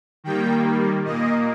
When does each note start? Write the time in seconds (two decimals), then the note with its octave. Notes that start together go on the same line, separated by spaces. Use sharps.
0.24 D#3 G3 A#3 G5
1.05 A#2 A#3 D#5